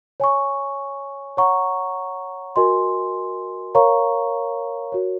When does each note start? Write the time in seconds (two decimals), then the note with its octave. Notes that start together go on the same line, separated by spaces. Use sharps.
0.20 C#5 G#5 C#6
1.37 C#5 F#5 A#5 C#6
2.56 F#4 A#4 D#5 G#5 C6
3.75 A#4 C#5 F5 A#5 C#6
4.92 F#4 A#4 C#5